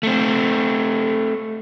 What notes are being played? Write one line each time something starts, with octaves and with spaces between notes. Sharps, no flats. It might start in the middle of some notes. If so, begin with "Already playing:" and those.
A3 C4